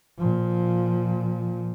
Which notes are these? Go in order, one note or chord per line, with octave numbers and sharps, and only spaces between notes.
A#2 F3